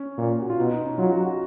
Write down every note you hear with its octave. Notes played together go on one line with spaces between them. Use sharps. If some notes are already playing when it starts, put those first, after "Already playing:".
Already playing: C#4
A#2
F#4
F4
B2 D#4
D#4
C#4
F#3 F4
F#4
F#4